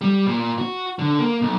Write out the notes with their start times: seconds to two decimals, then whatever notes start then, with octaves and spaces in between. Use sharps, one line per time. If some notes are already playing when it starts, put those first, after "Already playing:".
0.01 G3
0.26 A#2
0.59 F#4
0.99 D3
1.19 A#3
1.42 B1